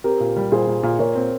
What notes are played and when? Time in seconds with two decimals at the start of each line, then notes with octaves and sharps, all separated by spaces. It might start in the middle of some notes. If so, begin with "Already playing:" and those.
0.04 C4 G4 A#4
0.20 A#2
0.37 G3
0.52 A#2 G#4 C5
0.67 A#2
0.83 A#2
0.99 A#2 A#4 C#5
1.15 C4